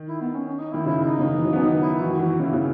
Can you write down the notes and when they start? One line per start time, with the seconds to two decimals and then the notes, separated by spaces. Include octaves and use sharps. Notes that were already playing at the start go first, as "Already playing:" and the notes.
Already playing: D#3
0.08 E4
0.21 B3
0.34 C#4
0.47 C#4
0.59 D#4
0.73 D#3 E4
0.86 C#3 E4
1.05 D#4
1.19 C#3
1.25 D#3
1.34 E3
1.44 F#3
1.53 B3
1.57 C#4
1.63 D#3 D#4
1.82 E4
2.02 E3 F#4
2.10 D#3
2.19 E3 F#4
2.40 C#3 E4
2.53 C#3